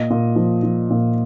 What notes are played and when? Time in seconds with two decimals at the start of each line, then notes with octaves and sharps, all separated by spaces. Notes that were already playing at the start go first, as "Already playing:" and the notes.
Already playing: A#2 D#5
0.10 A#2
0.36 F3
0.63 F3
0.90 A#2